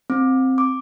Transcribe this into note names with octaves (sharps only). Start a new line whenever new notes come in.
C4
D6